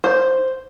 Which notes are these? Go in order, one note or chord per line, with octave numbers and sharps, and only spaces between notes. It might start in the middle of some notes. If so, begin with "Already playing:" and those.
C5